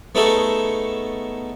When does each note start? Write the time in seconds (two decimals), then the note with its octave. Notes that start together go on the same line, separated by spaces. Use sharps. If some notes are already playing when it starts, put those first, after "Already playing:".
0.15 A3 B3 C#4 D#4 G#4 A4